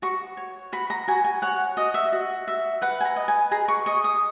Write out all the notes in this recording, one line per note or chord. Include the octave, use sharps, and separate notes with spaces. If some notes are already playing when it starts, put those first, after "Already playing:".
F#4 C#6
C#5
F#4 B5
A#5
F#4 G#5
G#5
C#5 F#5
F#4 D#5
E5
F#4
F#4 E5
B4 F#5
G#5
A#5
D#5
G#5
G#4 A#5
C#6
D#5 C#6
D#6